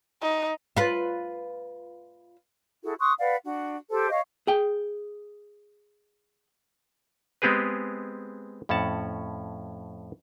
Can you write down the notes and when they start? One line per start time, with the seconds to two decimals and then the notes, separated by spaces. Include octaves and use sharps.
0.22 D#4
0.77 F4 B4
2.83 E4 F#4 G#4 A4
2.99 C6 C#6 D#6 F#6
3.19 B4 D5 F5 F#5
3.45 D4 F#4
3.90 G4 A4 C5 A5
4.10 C#5 D#5 F5 C#6
4.47 G#4 G5
7.42 G#3 B3 C4 G4 G#4 B4
8.69 F2 A2 C#4 F#5 A5